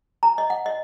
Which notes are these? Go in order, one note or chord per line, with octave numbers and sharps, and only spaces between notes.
A#5
D#5
F#5
D#5